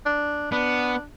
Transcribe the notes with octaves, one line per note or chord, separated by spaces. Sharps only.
D4
B3 D4